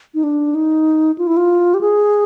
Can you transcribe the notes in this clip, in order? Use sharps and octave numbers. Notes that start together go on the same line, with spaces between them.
D#4
D4
D#4
F4
E4
F4
G4
G#4